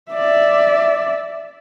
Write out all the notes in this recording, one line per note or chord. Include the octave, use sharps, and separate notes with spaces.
D5 E5